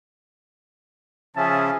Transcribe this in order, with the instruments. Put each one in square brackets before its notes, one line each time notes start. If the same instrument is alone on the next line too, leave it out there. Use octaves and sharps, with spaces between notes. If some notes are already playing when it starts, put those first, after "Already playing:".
[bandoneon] C#3 F3 C#4 [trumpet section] G#4 E5 A5